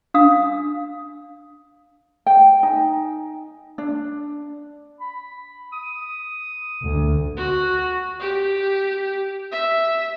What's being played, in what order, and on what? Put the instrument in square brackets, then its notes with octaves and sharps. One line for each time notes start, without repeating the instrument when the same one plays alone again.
[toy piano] D4 F5 D#6
[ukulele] G5
D#4 G#5
D4
[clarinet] B5
D#6
[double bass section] D2
[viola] F#4
G4
E5